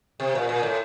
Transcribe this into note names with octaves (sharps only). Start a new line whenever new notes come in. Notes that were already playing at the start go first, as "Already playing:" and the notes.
C3
A#2
A#2
A2